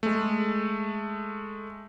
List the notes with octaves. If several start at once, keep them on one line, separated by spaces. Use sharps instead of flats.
G#3 A3